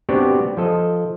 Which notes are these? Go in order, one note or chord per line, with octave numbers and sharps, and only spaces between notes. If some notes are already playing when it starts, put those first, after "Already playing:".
B3 C4 D4 F#4 G4
F3 A4 D#5